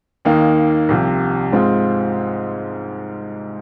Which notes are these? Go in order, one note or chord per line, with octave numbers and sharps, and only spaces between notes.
D#2 D#3 A#3 D#4
C2 C3 F3
G#2 G#3 C4 F4